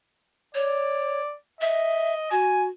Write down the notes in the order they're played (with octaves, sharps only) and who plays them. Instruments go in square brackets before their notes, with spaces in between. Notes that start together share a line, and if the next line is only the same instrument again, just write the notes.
[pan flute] C#5 [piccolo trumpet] D5
[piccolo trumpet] D#5 [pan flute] E5
[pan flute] F#4 [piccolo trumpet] G#5